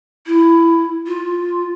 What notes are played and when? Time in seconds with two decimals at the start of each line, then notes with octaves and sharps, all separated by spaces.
0.27 E4
1.07 F4